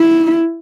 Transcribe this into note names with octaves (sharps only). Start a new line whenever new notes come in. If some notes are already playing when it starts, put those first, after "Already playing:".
Already playing: E4